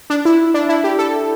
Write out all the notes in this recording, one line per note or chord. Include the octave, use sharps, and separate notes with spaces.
D4
E4
D4
E4
G4
A4